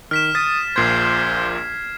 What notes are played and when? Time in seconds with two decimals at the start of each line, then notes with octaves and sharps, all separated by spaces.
0.11 D#3 F6 B6 E7
0.35 D#6 F6 A6 B6
0.76 A#1 A#2 C5 C6 G#6 C7